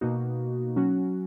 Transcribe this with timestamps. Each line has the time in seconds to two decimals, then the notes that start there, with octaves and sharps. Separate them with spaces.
0.01 B2 A#3 D#4 F#4
0.76 F#3 C#4 F#4